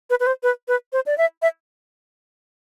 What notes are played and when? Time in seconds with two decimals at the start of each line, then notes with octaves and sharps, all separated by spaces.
0.10 B4
0.20 B4
0.27 C5
0.43 B4
0.68 B4
0.93 C5
1.06 D5
1.18 E5
1.42 E5